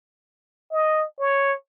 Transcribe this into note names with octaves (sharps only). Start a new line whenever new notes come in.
D#5
C#5